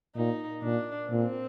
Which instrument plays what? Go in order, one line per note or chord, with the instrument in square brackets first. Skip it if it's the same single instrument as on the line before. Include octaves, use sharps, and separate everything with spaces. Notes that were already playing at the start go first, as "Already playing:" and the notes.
[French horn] A#2 [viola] D#4
[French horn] A#2 [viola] D4
[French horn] A#2 [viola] C4